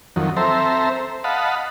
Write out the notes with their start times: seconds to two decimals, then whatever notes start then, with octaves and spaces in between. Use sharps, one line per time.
0.16 F2 D#3 F#3
0.37 C4 A4 C5 E5 A#5
1.24 D#5 F5 F#5 A5 B5